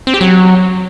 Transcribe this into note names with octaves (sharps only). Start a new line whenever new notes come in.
C4
G4
F#3